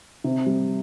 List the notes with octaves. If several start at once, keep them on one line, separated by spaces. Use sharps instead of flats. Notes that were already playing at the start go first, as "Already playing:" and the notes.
C3
G3